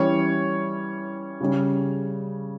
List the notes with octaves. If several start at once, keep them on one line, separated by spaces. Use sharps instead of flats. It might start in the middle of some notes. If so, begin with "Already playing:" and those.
Already playing: E3 G3 C#4 C#5
C#3 G3 C#4